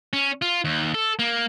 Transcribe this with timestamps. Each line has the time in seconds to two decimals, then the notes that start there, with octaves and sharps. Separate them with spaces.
0.13 C#4
0.42 F4
0.64 D#2
0.94 A4
1.19 A#3